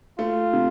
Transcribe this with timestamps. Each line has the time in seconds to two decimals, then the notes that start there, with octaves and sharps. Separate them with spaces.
0.18 A3 F4
0.53 C3